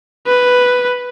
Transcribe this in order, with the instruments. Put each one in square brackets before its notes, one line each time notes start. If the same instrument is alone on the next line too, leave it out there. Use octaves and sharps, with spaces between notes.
[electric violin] B4